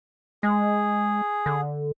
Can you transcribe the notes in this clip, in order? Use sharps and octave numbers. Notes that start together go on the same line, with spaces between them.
G#3 G#4
D3